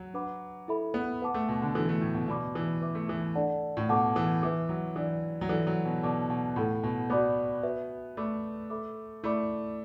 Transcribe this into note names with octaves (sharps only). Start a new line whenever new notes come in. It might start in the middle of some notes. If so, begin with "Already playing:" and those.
Already playing: F#3
D4 B4 F#5 B5 D6
E4 A4 E5 B5
B3
B4 F#5 A5 D6
A3
B2
D3
E3 D4 F#4 A4
A3
A2
B2
B2 F#4 D5 B5 D6
E3
B4 E5 D6
A3
E3
D4 A4 D5 F#5 A5
A2
B2 A4 F#5 A5 D6
E3
E3 B4 E5 D6
F#3
E3 D4 B4 D5
F#3
E3 D4 F#4 A4 D5
F#3
B2
B2 A4 D5 A5 D6
B2
A2 E4 A4 F#5 B5
B2
B3 F#4 D5 B5 D6
F#4 B4 E5
A3 B4 D5 B5 D6
A4 E5 B5 D6
A3 E4 D5 B5 D6